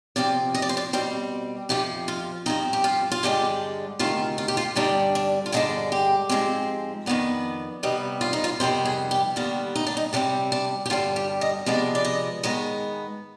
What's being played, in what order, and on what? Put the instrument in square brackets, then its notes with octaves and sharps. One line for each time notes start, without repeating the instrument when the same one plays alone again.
[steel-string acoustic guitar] C3 F3 C4 D5
D#5
D5
C5
D5
B2 G3 C4 C5
F2 C3 F3 G4
F4
G2 F3 C4 D#4
G4
F4
F4
G2 D3 G#3 D4 G4
D2 C3 D#3 F4
F4
G4
F4
G2 D3 G3 D4 D#4
D4
F4
G2 D3 G#3 D4 D#4
G4
G#2 F3 G#3 C4
F2 D#3 B3 D4
C3 G3 B3 D#4
F4
D#4
F4
F2 C3 D#3 G3 B3 C5
G#4
G4
D#2 D3 G3 B3 F4
D#4
D4
D#4
C3 G3 C4 D4
D4
G4
G2 D3 G3 D4 F4
G4
D#5
C3 F3 G#3 B3 D4 D5
D5
D#5
G#2 D#3 G#3 B3 D#5